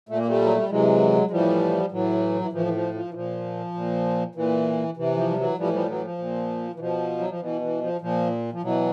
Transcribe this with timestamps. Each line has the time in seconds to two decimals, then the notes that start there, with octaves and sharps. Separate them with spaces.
0.09 A#2 A3
0.18 A#3
0.27 G3 A3
0.42 F#3
0.56 G3
0.69 C3 E3 F#3 G#3
1.27 G#3
1.31 A2 E3 F3 G3
1.91 A2 E3 F#3
2.41 E3
2.52 A2 E3 F3
2.66 E3
2.73 F3
2.94 F3
3.10 E3
3.14 A#2 F3
3.74 A#2
4.35 A#2 E3
4.97 C3 E3
5.17 F3
5.31 G3
5.37 E3 F#3
5.57 A2 E3 F3 G3
5.73 F3 G3
5.88 E3 F#3
6.03 F3
6.18 A#2
6.75 E3
6.79 B2 F3
7.19 F#3
7.30 F3
7.40 B2 E3
7.61 E3
7.81 F3
8.01 A#2 F3
8.53 F3
8.62 B2 E3 F#3